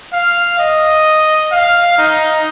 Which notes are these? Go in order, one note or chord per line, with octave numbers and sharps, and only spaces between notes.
F5
D#5
F5
D#4